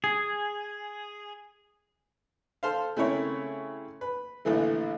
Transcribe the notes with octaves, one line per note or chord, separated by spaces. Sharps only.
G#4
A4 C5 F5
C#3 A3 C4 E4 A#4 C#5
B4
A#1 A2 D3 E3 A3